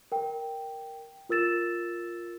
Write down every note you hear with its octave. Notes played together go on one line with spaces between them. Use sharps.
A#4 G5
F4 A#4 E6 A6 E7